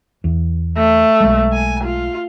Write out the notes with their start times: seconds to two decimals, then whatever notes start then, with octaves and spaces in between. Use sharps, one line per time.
0.24 E2
0.77 A3
1.21 B1 G#3
1.53 G#5
1.83 F4